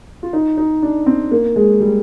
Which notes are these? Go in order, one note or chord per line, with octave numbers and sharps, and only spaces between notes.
F4
D#4
D#4
D4
C4
A#3
G#3
G3